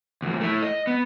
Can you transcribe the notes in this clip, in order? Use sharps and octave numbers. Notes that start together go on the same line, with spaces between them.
D2 F3
A3 E4
D#5
B3